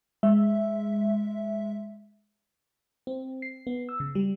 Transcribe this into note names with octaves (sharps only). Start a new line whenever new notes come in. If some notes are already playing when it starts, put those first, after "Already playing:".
G#3 E5
C4
C7
B3
E6
C#3
G3